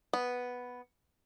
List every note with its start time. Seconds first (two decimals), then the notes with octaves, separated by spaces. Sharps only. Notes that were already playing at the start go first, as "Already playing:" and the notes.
0.13 B3